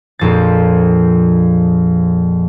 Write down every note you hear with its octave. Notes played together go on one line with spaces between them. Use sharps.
A#1 F2 A6